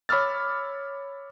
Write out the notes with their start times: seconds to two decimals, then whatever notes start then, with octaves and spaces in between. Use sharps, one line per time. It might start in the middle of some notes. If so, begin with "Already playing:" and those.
0.09 C#5 B5 D6 E6 F6 A6